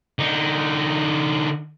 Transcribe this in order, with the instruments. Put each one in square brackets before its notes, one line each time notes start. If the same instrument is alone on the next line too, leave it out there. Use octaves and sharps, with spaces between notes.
[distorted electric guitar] D3 D#4